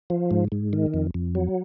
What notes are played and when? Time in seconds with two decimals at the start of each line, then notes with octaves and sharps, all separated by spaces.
0.10 F3
0.31 G#2
0.52 G#2
0.73 D#3
0.94 F2
1.14 F2
1.35 F#3